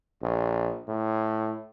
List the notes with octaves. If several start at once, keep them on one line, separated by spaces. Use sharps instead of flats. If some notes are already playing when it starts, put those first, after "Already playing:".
A#1
A2